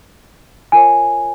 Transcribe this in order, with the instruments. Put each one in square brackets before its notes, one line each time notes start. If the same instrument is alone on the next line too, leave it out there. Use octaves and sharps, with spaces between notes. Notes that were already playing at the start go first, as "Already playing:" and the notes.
[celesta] F4 A#4 C#5 G#5